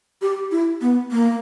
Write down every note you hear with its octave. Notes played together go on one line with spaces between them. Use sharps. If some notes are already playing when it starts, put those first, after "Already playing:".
G4
E4
B3
A#3